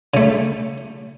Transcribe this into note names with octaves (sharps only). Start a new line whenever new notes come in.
C#3 A3